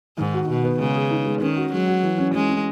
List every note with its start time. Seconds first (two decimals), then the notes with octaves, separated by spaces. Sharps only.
0.18 G#2 D#3
0.34 F#4
0.48 B2 F#4
0.64 B3
0.79 C#3 G#3
0.95 G#4
1.10 D#4
1.26 G#3
1.40 D#3 C#4
1.57 F#4
1.71 F#3 G#3
1.87 F#4
2.03 E3
2.18 C#4
2.33 G#3 C#4
2.49 C#4